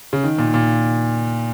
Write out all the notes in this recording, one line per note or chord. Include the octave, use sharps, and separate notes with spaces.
C#3
D#3
A#2
A#2